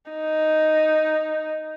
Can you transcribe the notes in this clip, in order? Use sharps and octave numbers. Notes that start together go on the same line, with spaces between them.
D#4